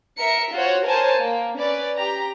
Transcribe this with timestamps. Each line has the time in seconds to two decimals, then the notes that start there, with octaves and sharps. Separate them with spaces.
0.19 A#4 E5 C#7
0.54 F4 F#4 C5 C#5
0.86 A#4 C5 C#5 G#5 A5
1.18 A#3
1.58 C#4 B4 D5
1.95 G4 A#5